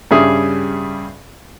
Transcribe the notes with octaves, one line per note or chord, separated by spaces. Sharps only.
G2 C#3 G3 G#4 E5 D#6